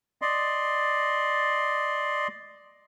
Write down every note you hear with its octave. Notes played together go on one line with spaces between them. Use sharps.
D5 D#5 C6